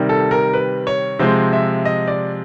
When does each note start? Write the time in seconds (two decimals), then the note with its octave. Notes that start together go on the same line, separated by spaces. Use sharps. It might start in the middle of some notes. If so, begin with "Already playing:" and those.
Already playing: C3 D#3 G3
0.09 A4
0.31 A#4
0.53 B4
0.87 C#5
1.19 C3 F3 G#3 C5
1.53 E5
1.85 D#5
2.07 D5